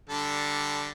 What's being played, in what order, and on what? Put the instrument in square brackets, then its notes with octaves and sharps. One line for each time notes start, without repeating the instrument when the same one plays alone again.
[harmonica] D3 G3 A4